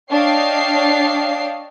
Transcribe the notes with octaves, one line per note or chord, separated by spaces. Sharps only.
D4 C#5 D#5 F5 G5 C7